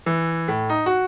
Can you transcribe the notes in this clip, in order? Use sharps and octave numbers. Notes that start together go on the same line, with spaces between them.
E3
A2
D#4
F#4